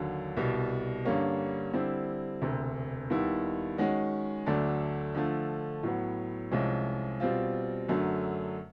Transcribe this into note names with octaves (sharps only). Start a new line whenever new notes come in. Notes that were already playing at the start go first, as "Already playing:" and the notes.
Already playing: D#2 D3 F#3
C2 B2 G3
G2 D3 G3 A#3 C#4
D3 G3 C4 E4
E1 D2 C3
D#2 D#3 G3 B3 E4
D#3 G#3 C#4 F#4
D2 D3 F#3 A3 D4
D3 F3 A3
A2 F#3 B3
C2 C3 F3 G#3 C#4
B2 G3 C4 F4
F#2 D3 F#3 A3